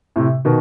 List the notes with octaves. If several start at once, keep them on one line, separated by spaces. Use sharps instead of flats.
A2 C3
B2 D#3